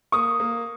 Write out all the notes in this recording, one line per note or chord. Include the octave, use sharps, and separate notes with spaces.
A#3 C#6 D#6
A#3